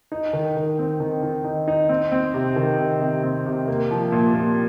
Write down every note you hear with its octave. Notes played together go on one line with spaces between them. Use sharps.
D#4
D#3
D#3
C4
D#3
D#3
D#4
D#4
C4
C4
C3
D#3
C3
C3
C4
C3
A#3
F3
A#2
A#2